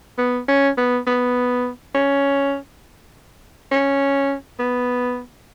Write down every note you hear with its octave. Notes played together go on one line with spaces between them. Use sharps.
B3
C#4
B3
B3
C#4
C#4
B3